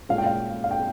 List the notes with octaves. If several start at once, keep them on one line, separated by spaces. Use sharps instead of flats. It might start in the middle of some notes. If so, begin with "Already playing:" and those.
A#2 G#3 C#4 F5
G5
F5
F5
G5